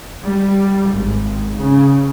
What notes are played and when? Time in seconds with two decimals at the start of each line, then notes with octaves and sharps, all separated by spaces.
0.24 G3
0.92 G#1
1.57 C#3